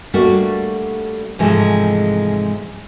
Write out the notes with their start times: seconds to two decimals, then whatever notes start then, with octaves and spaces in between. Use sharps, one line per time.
0.14 G3 A3 A#3 D4 F#4
1.39 G#2 C3 E3 F3 G#3 A3